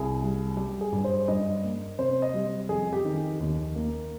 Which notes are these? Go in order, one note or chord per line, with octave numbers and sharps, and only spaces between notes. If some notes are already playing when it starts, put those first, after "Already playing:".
Already playing: C2 G#4
G3
G3 G4
G#4
G2
C5
G2 D#5
A#3
C3 C5
D#5
G3
F2 G#4
G4
D#3
D#2
A#3